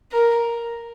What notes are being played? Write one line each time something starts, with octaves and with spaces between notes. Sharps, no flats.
A#4